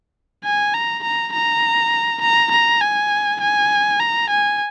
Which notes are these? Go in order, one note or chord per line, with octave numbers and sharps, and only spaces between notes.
G#5
A#5
A#5
A#5
A#5
A#5
G#5
G#5
A#5
G#5